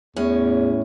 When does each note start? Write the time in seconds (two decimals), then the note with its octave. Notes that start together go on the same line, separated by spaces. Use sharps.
0.16 E2 A2 C#4